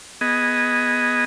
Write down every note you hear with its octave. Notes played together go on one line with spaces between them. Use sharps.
B3 G#4 D#5